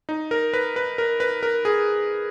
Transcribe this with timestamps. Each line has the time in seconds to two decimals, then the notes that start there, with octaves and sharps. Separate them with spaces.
0.09 D#4
0.31 A#4
0.54 B4
0.76 B4
0.98 A#4
1.20 B4
1.43 A#4
1.65 G#4